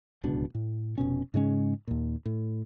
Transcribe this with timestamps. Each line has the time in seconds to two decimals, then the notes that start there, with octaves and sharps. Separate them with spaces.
0.24 D1 C#2 B2 D4
0.55 A2
0.98 F1 B2 C#4
1.34 G#2 C#3 G#3 C#4
1.87 D#2 A#2
2.25 A2